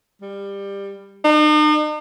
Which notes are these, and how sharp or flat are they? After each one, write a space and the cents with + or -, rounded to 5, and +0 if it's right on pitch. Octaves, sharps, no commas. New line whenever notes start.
G3 +20
D#4 -45